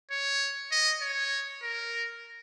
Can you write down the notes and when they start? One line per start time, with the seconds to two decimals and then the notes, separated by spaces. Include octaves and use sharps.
0.11 C#5
0.72 D#5
1.02 C#5
1.63 A#4